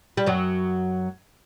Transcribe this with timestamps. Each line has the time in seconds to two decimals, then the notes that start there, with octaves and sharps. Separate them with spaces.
0.17 G3
0.26 F#2 F#3